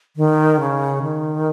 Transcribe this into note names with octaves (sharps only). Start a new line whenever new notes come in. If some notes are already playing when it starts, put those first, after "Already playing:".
D#3
C#3
D#3